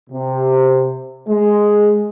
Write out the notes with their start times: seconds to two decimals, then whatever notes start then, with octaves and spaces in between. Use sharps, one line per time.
0.10 C3
1.26 G#3